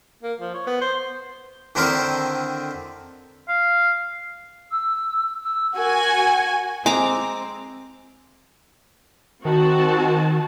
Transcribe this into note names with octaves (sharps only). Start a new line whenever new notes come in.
A#3
F3
C#5
B3
C5
D3 D#3 C4 E4 A#4 C5
F5
E6
E6
F#4 A#4 G#5
G#3 C4 A#5 D6
D#3 C4 F#4 A5